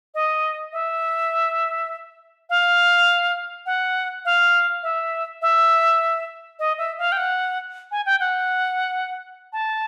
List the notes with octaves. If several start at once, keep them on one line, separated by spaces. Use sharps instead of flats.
D#5
E5
F5
F#5
F5
E5
E5
D#5
E5
F5
G5
F#5
G#5
G5
F#5
A5